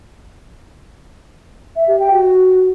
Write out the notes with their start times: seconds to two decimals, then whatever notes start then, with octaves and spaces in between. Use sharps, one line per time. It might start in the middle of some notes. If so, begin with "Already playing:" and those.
1.76 E5
1.88 G4
2.00 G5
2.11 F#4